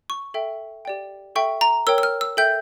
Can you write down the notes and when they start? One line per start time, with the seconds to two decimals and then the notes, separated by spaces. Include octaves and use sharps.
0.10 C#6
0.34 A4 E5 G5
0.85 G4 D5 G5
1.35 A4 E5 G5 C#6
1.61 A#5
1.87 A#4 C#5 G5 E6
1.98 E6
2.03 F6
2.21 E6
2.37 A4 E5 G5 G6